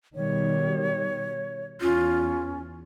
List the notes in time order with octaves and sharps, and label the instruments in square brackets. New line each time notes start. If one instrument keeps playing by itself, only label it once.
[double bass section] B2 D#3 G3 [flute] C#5
[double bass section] E2 [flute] C#4 [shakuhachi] F4